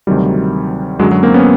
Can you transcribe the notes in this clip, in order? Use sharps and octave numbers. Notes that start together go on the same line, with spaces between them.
D2 C3 D#3 F#3 G3
F#2 D3 F#3 G#3
F#3
A#3 C4
B3 C#4